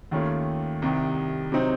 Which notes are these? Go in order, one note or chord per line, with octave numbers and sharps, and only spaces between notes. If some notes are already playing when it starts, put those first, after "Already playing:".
D#2 D#3 A3 C#4 F4
C2 C3 D#3
C3 F#3 C4 D#4